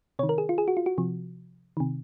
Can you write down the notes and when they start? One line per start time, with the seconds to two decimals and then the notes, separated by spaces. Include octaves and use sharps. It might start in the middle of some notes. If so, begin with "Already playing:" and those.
0.19 C3 C#5
0.23 D#3
0.29 A#4
0.38 G#4
0.49 F4
0.58 G#4
0.68 F#4
0.77 F4
0.86 F#4
0.98 C3 F3
1.77 C3 D#3